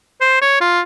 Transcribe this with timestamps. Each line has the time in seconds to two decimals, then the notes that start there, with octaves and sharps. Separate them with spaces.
0.21 C5
0.42 C#5
0.61 F4